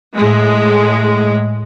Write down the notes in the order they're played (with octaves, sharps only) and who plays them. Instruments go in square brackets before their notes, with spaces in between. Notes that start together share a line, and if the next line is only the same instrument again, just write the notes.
[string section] A2 G#3